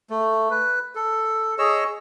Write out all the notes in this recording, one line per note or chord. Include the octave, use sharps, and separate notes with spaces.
A3
B4
A4
G#4 C#5 D#5 E6